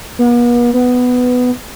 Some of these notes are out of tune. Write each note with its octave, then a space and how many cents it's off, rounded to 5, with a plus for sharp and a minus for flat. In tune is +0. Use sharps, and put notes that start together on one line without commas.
B3 -45
B3 +10